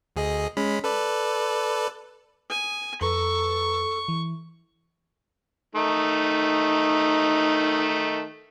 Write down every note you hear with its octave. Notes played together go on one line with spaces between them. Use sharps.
D2 G#4 D#5
G#3 C#4 B5
A4 B4 D5
G#5 D#6
F2 A4 B4 A#5 C#6
E3
D#3 A3 D#4